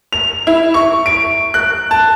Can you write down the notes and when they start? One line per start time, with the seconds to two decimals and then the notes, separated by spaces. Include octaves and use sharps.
0.13 F7
0.47 E4
0.74 C#6
1.06 D7
1.54 F#6
1.91 A5